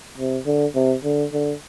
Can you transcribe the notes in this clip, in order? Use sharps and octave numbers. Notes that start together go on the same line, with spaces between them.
C3
D3
C3
D3
D3